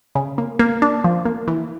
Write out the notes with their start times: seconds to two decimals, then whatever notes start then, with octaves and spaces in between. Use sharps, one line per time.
0.15 C#3
0.38 A#3
0.59 A#3
0.82 D4
1.04 F3
1.25 A#3
1.48 E3